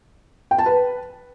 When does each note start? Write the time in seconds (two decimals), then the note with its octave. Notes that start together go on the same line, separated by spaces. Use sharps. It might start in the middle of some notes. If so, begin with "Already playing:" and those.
0.51 G5
0.58 A5
0.66 B4